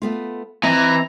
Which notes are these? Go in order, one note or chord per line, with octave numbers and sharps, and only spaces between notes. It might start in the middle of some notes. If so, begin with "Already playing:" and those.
A3 B3 F4
E3 C4 D#5 A#5